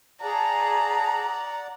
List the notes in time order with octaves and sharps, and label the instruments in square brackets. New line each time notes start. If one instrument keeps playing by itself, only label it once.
[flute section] G#4 A5 [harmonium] D5 F#5 [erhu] A#5